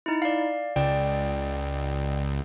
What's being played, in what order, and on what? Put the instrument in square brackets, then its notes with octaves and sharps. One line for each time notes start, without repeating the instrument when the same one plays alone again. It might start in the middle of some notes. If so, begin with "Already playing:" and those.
[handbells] D#4 E4
D5 F5
[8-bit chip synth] C#2 [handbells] D5 G5